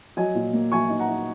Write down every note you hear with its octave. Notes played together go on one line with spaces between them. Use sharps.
F#3 D#5 G#5
A#2
A#3
F#3 G#5 C#6
D#4
F#5 A#5
D#4